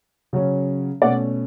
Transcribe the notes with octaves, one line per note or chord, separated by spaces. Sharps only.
C#3 F#3 C#4
B2 A3 C#4 D5 F#5